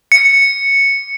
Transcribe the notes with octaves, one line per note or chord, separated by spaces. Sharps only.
C#7